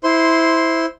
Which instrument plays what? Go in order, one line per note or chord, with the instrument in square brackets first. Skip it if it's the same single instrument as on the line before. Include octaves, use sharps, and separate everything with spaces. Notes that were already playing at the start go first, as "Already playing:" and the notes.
[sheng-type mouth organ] E4 C5 C6